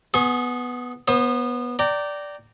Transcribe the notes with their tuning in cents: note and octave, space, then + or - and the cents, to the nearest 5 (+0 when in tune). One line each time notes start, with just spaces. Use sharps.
B3 +0 G#4 +20 C#6 -35
B3 -15 C5 +35 D#6 -10
D5 -5 G5 -20 A#5 -20